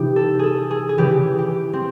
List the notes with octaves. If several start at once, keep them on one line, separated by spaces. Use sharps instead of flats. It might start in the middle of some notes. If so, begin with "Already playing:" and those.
Already playing: C3 E3 D#4 G4
A4
G#4 A4
G#4
G#4
C#3 E3 G4
G4
C4